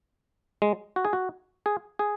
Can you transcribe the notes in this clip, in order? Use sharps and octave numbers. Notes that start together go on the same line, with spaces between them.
G#3
F#4
G#4
F#4
G#4
G#4